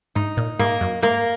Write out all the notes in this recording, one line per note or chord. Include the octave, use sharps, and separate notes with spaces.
G#2 D#4
A#2
G#2 A#3
F#2
G#2 A#3